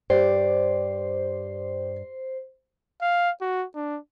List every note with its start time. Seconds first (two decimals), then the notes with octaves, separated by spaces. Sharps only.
0.10 G2 G4 C5 D5
3.02 F5
3.41 F#4
3.75 D4